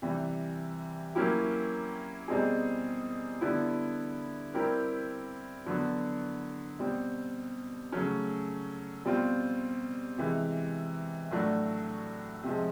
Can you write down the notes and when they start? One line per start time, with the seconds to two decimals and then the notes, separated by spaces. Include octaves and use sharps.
0.02 C3 E3 G3
1.15 F#3 A#3 C#4 E4 G4
2.28 B2 G3 C4 D#4 G#4
3.41 D3 G3 B3 E4
4.54 G3 C4 E4 G4 A#4
5.66 D3 F#3 B3
6.79 B2 G3 C4
7.92 C#3 F#3 A3 C#4
9.05 B2 G3 C4 F4
10.18 C3 E3 G#3
11.31 A2 F#3 A3 D4 F#4
12.44 C3 F3 G#3